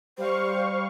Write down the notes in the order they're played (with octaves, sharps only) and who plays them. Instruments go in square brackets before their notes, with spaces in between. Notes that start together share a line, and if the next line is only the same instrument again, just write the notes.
[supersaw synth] G3 F5 C#6 [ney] C5